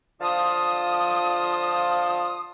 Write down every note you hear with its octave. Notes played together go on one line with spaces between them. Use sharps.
D3 F3 F4 F5 A5 D#6